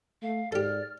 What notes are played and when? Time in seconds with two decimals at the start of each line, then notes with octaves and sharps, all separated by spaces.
0.22 A3 F5
0.52 G#2 G4 A4 D5 F6